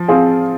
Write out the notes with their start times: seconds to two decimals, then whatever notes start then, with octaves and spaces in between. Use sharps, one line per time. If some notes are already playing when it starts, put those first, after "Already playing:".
Already playing: F3
0.08 C4 F4 G#4